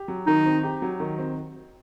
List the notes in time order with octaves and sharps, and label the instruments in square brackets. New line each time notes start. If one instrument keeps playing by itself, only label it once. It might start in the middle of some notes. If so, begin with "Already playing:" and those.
Already playing: [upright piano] G4
F#3
[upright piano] D#3 [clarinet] D#4
[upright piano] C4
G4
F#3
D#3
C4